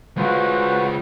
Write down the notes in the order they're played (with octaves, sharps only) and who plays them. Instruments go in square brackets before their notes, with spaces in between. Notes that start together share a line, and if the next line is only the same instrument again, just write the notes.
[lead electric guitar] G#3 F4 [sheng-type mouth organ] F#4 B4 C5